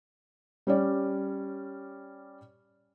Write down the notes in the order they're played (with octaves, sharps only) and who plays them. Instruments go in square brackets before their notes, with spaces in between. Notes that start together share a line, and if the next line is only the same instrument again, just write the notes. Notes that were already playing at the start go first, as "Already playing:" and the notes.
[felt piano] G3 C#4 D5